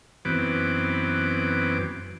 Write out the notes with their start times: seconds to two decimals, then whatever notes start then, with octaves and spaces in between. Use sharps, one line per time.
0.25 F#2 E3 B3 C4 D6